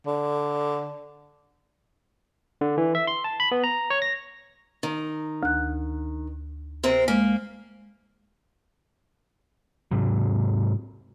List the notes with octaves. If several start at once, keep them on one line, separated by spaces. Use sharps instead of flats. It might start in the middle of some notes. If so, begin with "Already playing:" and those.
D3
D3
E3
E5
C6
A5
B5
B3
A#5
C#5
A#6
D#3
D2 F#6
C3 C4 A#4
G#3 A#3
G#2 C3 F#3